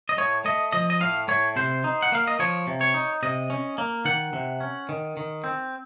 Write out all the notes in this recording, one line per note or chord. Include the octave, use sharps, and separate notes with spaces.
D#5
A2 C#5
A3 D#5
F3 D#5
D#5
A2 F5
A2 C#5
C3 C5
D#4
F#5
A#3 F5
D#5
F3 C#5
C3
C#5
D#4
C3 D#5
C#4
A#3
D#3 F#5
C3
C#4
D#3
D#3
C4